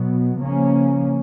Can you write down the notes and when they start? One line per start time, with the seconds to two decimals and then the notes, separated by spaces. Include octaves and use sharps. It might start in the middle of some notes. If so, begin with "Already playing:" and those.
Already playing: B2 F#3 B3
0.38 C#3 F3 A#3 C#4